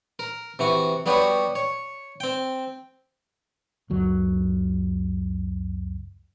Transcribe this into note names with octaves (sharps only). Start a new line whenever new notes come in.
A#4
C3 E3 F#4
G3 B3 F#4 G4 B4 C#5
C#5
C4 G5
F#1 C#2 F#3